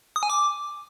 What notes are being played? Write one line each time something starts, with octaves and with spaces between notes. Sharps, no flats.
D#6
G#5
D6